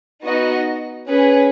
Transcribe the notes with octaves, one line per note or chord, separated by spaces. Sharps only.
B3 D#4 F#4 D#5
C#4 G#4 B4